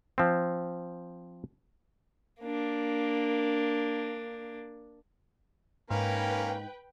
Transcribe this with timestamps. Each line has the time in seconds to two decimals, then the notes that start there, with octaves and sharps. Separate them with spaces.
0.18 F3 C4
2.40 A#3 D4
5.91 G#2 A#3 C#4 B4 F5 G5